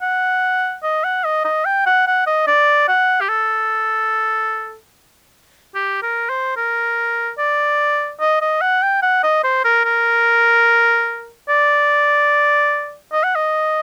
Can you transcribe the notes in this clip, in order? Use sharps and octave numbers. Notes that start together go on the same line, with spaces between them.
F#5
D#5
F#5
D#5
D#5
G5
F#5
F#5
D#5
D5
F#5
G4
A4
G4
A#4
C5
A#4
D5
D#5
D#5
F#5
G5
F#5
D#5
C5
A#4
A#4
D5
D#5
F#5
D#5